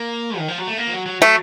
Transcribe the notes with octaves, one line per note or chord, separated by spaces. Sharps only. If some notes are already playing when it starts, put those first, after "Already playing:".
Already playing: A#3
D#3
F3
F#3
A3
A#3
F3
F#3
F#3
F#3 A3